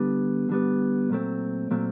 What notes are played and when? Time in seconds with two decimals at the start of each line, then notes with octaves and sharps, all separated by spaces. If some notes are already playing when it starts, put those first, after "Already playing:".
Already playing: D3 G3 B3
0.49 D3 G3 B3
1.10 A#2 F#3 A3 C4
1.71 A#2 F#3 A3 C4